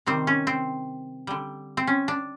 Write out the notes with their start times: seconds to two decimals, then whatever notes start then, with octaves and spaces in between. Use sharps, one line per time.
0.06 C3 D#3 G3 C4
0.27 C#4
0.47 C4
1.27 D3 G3
1.77 C4
1.87 C#4
2.08 D4